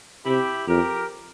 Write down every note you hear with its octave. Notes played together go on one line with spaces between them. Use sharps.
C3 E4 G4
F2 G4 A#4